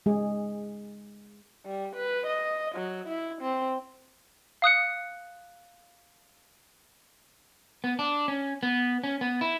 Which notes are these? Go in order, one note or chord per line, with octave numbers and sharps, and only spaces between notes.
G#3 G#4
G3
B4
D#5
F#3
E4
C4
F5 D#6 F#6 C#7
B3
D4
C#4
B3
C#4
B3
E4